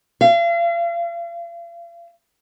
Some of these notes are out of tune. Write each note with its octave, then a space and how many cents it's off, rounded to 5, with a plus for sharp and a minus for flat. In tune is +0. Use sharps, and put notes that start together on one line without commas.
F5 -40